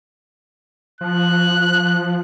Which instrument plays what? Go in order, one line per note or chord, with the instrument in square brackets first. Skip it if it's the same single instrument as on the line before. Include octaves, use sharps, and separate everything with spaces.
[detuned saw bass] F3 [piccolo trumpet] F#6